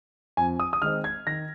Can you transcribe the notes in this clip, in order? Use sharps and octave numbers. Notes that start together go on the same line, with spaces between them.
F2 G#5
D#6
D#6
D#3 G#3 C4 D#4 F6
G#6
D#3 A#6